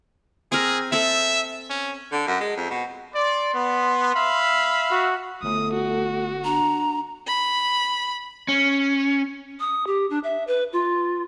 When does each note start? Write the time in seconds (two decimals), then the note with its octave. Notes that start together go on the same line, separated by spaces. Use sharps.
0.52 C4 G#4 A#4
0.92 C4 A4 E5
1.70 C#4
2.12 D3
2.27 F#2
2.40 G#3
2.57 F2
2.70 B2
3.15 D5 C6
3.55 B3
4.15 E5 F5 B5
4.91 F#4
5.43 G1 A3 D#6
5.74 F#4
6.44 D4 A#5
7.27 B5
8.48 C#4
9.60 D#6
9.87 G4
10.10 D4
10.24 E5
10.47 B4
10.73 F4